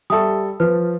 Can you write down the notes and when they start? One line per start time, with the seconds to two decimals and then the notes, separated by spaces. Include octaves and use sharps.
0.10 G3 G4 A4 E5 D#6
0.60 F3 B4